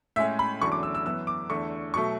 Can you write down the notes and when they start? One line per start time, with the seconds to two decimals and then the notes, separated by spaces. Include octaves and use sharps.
0.16 A2 G#3 C#4 E5
0.39 B5
0.61 E2 D3 F#3 A3 C#4 C#6
0.72 D6
0.83 E6
0.95 E6
1.05 F#2 E3 B3 E6
1.27 D6
1.49 E2 D3 A3 C#6
1.94 B2 F#3 A3 C#6